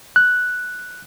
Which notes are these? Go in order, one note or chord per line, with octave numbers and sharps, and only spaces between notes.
F#6